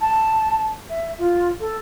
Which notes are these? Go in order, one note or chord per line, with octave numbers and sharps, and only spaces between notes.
A5
E5
F4
A4